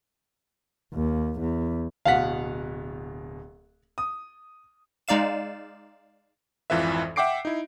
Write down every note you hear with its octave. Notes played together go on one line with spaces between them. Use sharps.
D#2
E2
D1 B2 F5 F#5 B6
D#6
G#3 D#4 D5 F5 E7
G#1 F2 E3 F4 B4 E5
E5 F#5 G5 D6 C7 D7
D#4 E4